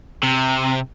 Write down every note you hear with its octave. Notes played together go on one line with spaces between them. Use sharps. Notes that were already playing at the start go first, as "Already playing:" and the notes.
C3